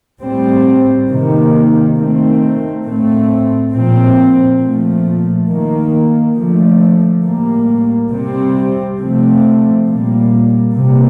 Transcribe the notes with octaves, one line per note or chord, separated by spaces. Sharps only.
A2 G3 C4
C3 D#3 A#3
D#3 A3 C4
A2 A3 C4
A#2 F3 C4
A#2 F3 A3
D#3 A#3
D3 F3 A3
A2 G3 A#3
C3 G3 C4
C3 F3 A3 C4
A#2 G3 A#3
C3 G3 A#3